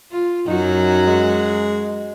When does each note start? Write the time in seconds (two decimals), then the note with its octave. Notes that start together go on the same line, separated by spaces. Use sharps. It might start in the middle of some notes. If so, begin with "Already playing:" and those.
0.12 F4
0.47 F#2 F#3 D#4 F#4
1.07 G#3